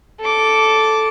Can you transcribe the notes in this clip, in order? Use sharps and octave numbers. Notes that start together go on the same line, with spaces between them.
A4 D6